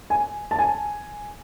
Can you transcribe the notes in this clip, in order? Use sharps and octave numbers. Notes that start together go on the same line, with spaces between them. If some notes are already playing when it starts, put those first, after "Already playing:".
G#5
A5
G#5